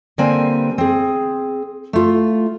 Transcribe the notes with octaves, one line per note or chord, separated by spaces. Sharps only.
D3 G3 A#3 C4 B4 G#5
C4 G#4
A3 F4